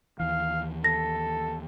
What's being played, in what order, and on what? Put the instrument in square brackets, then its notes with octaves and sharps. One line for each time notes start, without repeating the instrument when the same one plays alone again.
[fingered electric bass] D#2 E3 [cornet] F5
[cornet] A4 [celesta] A#6